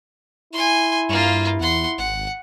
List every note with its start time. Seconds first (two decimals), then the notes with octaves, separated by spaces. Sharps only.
0.53 E4 G#5 C6
1.09 G2 A#3 F4
1.60 E2 F#5 C6
1.98 G#1 F#5